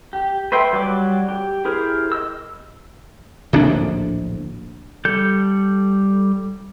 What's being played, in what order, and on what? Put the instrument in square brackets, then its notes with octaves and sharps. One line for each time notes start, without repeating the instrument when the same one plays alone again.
[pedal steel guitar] G4
B4 C5 E5 G5
F#3 G3 D5 D6
G4
E4 G4 G#4 A#4 C5
D#5 E6
[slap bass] D1 A#1 D3 D4
[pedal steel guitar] G3 A4 G6